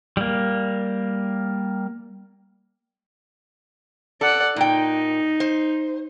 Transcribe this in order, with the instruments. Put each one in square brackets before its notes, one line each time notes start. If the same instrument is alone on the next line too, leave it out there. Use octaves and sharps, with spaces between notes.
[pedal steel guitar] G3 A#3
[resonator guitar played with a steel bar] A4 [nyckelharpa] D5 F#5
[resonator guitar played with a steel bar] A#2 G5 [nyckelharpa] D#4
[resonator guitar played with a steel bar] C5